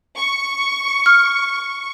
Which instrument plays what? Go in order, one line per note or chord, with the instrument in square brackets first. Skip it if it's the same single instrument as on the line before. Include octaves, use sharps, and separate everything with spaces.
[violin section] C#6
[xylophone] F6